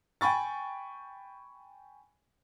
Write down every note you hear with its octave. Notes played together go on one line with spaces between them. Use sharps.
G5 G#5 B5 C#6 A6